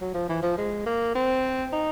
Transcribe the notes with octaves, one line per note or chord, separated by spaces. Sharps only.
F#3
F3
E3
F3
G#3
A#3
C4
D#4